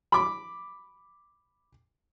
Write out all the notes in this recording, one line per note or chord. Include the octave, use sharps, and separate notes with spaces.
B5 D6